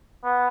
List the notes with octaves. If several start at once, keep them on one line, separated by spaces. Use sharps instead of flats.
B3